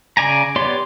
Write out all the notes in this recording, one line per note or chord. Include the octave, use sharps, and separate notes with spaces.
C#3 D5 G#5 A#5
B3 G4 C#5 D5 C6